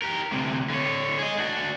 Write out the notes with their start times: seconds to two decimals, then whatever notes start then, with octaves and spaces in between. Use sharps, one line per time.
0.02 G4 A#4
0.32 D2 C3
0.70 D3 C#5
1.19 G#4 D#5
1.37 D4 F#4